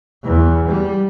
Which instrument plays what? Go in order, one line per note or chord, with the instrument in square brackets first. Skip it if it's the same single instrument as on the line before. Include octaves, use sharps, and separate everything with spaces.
[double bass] E2
G3